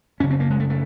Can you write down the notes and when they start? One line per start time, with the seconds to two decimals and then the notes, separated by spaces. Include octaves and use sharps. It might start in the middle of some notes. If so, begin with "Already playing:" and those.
0.20 F#2 C#4
0.24 C#3
0.30 C4
0.40 A#3
0.50 G#3
0.60 A3
0.70 A3